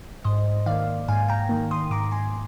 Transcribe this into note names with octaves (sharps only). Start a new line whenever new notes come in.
G#2 C5 D#5
D#3 A#3 D5 F5
G#2 F5 G#5
G5 A#5
D#3 A#3
C6 D#6
G#2 A#5 D6
G#5 C6